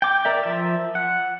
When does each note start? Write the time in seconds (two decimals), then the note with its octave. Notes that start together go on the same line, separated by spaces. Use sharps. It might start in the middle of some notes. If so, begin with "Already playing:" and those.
0.02 G5 D6
0.25 A#4 D5 E5
0.43 F3 E5
0.95 F#5